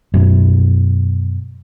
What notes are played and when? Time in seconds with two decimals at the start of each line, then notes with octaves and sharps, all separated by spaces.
0.14 F#2 B2